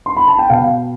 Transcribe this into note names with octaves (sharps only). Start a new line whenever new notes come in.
C6
B5
A5
G5
B2 F5